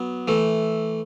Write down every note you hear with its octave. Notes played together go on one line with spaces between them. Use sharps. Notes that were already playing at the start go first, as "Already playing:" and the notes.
Already playing: F#3 B3
E3 A3